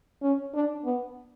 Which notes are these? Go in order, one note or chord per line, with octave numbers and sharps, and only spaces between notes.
C#4
D4
B3